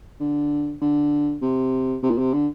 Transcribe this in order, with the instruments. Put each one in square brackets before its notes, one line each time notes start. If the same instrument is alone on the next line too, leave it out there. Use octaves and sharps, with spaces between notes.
[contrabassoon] D3
D3
C3
C3
A#2
C3
D3